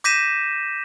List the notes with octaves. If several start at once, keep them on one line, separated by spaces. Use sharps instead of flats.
D6 G6 A#6 B6 D#7 E7